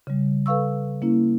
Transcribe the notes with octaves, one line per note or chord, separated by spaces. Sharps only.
C#3 G3
A4 B4 F5 C#6 E6
A#3 C#4 E4